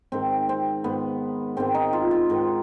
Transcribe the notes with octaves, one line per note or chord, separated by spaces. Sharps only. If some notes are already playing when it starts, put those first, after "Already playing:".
G#2 D#3 C4
C4
G#2 D#3 B3
G#2 D#3 C4
D#4
F4
F4
G#2 D#3